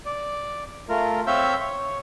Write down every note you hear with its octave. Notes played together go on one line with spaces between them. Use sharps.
D5
A3 F4 A#4
C4 C#5 E5 F5 E6 G6
C#5